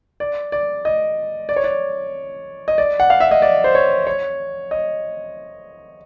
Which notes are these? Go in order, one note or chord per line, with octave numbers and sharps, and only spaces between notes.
D5
D5
D#5
D5
C#5
D5
D#5
D5
F#5
F5
E5
D#5
D5
C5
C#5
C#5
D#5